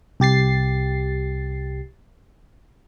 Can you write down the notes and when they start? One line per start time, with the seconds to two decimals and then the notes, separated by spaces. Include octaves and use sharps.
0.20 C2 G4 A6 C7